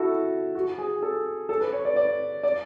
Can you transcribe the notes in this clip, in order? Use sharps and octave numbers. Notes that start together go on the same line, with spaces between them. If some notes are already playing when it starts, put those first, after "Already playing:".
Already playing: E4 F#4 A4
F#4
G#4
A4
A4
B4
C#5
D5
D5
D5